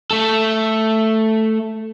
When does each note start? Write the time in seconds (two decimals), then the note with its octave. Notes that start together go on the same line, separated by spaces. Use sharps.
0.11 A3 A4